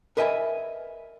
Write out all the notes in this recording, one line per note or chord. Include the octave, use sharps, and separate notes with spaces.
A#4 B4 D#5 E5 G5 G#5